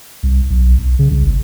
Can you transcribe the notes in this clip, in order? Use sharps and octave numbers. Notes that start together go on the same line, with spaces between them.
C2
B1
B1
C#3
C2
G1